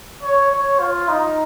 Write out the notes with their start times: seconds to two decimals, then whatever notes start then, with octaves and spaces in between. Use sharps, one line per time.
0.23 C#5
0.51 C#5
0.79 F4
1.08 D#4